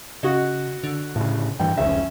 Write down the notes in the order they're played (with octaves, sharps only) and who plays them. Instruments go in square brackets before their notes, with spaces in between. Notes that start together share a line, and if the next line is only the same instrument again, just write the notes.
[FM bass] C#3 [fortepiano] F#4 D#5
[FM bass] D3
[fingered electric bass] A2 C#3
[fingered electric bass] G2 E3 [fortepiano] G5
[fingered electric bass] F1 C#2 C#3 [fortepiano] C#4 E5